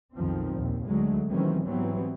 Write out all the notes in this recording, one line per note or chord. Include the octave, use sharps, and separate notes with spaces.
B1 F2 D#3 F3 C4
A#1 D#2
D2 D3 F#3 G#3 A3
C3 D#3 E3 F#3 C4 C#4
G#2 E3 F#3 G3 B3 C4